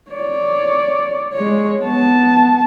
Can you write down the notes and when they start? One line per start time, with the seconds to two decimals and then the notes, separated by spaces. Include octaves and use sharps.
0.11 C#5 D5
1.34 G#3 C#5
1.82 B3 A5